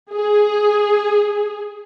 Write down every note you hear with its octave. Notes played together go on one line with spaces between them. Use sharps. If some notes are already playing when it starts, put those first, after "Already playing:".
G#4